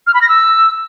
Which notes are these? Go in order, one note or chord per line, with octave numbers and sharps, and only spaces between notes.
F6
B5
A#6
E6